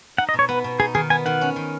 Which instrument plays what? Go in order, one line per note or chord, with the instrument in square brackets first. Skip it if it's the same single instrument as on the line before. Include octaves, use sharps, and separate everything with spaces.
[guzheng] D#4 [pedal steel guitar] F#5
[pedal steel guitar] D#5
[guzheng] B2
[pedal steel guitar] C#5
[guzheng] B3 [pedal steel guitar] B4
[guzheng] B2
[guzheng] D#4 [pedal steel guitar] G#4
[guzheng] D#3 [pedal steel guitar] G#4
[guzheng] B3 [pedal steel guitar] G#5
[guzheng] D#3 [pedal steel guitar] F#5
[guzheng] C#4
D#3